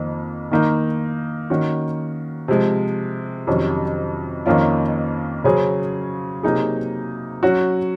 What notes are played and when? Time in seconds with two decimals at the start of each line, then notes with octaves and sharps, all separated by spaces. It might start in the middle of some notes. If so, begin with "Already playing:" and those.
Already playing: F2 D#3 A#3
0.51 D#3 A#3 D#4
1.50 D#3 A#3 C#4 F#4
2.48 C3 F3 G#3
3.47 F2 C3 D#3 F#3 C#4
4.46 F2 D#3 A#3 C#4 F4
5.44 C#3 F#3 C#4 G#4 C5
6.43 C3 F#3 A#3 D#4 G#4
7.43 F#3 C#4 F#4